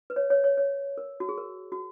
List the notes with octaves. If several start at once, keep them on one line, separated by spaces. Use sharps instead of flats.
B4
C#5
C#5
C#5
C#5
A#4
F#4
G#4
A#4
F#4